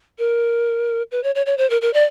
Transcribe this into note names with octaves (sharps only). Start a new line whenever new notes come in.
A#4
B4
C#5
C#5
C#5
C5
A#4
A#4
D5